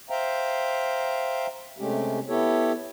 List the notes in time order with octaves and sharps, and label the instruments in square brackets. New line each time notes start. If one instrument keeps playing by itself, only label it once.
[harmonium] C5 E5 F5 G5 A#5
C3 G#3 A3 C#4 G4
B3 E4 G4 A4 C#5